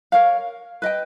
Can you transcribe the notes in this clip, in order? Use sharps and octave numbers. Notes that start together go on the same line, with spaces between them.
A#4 C#5 F5
B4 D#5 G5